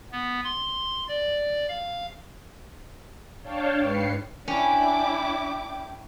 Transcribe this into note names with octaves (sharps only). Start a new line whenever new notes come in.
B3
C6
D5
F5
D4 C#5 F5 G5 A5
G#2 B4 C7 C#7
C#4 D4 E4 G5 D6